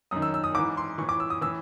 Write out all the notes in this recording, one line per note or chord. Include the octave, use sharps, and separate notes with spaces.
F#2 D#3 D#6
E6
E6
D#6
G#2 E3 D6
C6
A2 E3 C#6
D6
E6
D#6
A2 E3 E6